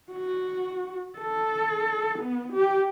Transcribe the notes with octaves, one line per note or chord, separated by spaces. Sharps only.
F#4
A4
B3
G4